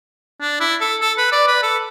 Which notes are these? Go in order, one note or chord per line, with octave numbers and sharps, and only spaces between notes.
D4
E4
A4
A4
B4
D5
B4
A4